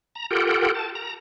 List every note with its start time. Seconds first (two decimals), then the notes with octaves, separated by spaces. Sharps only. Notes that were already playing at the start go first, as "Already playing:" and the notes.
0.15 A#5
0.31 F4 G4 A4 A#4 F#5 G5
0.74 A5
0.95 A#5